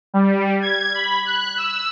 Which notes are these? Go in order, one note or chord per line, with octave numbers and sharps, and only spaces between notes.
G3
G#6
B5
F#6
E6